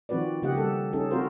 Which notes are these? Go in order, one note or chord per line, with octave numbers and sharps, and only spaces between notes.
D#3 F3 C4 F#4 B4 D5
C#3 A#3 G4 D#5 F#5
G3 G4 A4
C#4 D#4 G#4 A4
C4 F4 F#4 A#4 C5